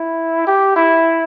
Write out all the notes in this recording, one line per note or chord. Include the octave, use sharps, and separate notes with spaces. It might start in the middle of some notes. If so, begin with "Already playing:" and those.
Already playing: E4
G4
E4